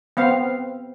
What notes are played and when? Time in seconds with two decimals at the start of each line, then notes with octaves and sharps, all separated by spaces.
0.17 B3 C4 F5